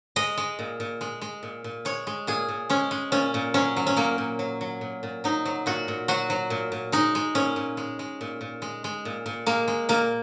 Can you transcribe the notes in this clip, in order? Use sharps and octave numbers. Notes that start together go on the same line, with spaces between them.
G#3 D#5
G#3
A#2
A#2
G#3
G#3
A#2
A#2
G#3 C#5
G#3
A#2 G#4
A#2
G#3 C#4
G#3
A#2 C#4
A#2
F#3 C#4
F#3
C#4
A#2 A#3
A#2
F#3
F#3
A#2
A#2
F#3 D#4
F#3
A#2 F#4
A#2
F#3 F#4
F#3
A#2
A#2
G#3 D#4
G#3
A#2 C#4
A#2
G#3
G#3
A#2
A#2
G#3
G#3
A#2
A#2
G#3 A#3
G#3
A#2 A#3